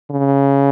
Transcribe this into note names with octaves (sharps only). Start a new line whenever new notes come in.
C#3